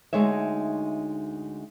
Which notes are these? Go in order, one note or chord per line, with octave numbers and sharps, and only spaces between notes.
D2 G2 G#3 D#4 C#5 E5